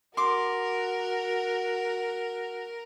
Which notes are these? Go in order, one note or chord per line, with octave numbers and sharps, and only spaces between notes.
F#4 A#4 C6 D6